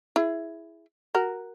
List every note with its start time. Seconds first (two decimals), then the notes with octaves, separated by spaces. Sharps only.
0.16 E4 G#4
1.15 F#4 A#4